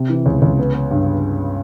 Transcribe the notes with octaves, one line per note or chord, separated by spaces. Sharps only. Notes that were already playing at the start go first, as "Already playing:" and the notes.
Already playing: C3
E3
C#2
C#2
B3
B3
G2